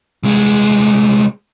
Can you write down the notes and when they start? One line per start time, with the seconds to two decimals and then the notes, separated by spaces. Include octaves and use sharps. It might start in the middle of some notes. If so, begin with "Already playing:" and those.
0.23 C2 G#3